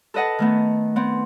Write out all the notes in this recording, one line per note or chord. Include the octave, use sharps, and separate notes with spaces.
A4 B4 D#5 F#5 A5
D#3 A3 B3
B3 C4